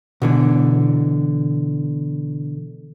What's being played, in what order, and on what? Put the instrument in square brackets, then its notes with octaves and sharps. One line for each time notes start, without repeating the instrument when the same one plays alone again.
[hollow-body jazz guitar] B2 D3 E3